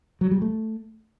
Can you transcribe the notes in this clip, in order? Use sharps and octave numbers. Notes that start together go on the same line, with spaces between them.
F#3
G3
A3